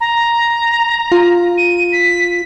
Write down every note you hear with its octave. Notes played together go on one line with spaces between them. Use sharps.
A#5
F4
D#7
B6